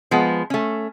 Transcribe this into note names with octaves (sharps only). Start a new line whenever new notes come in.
F3 G#3 B3
A3 C#4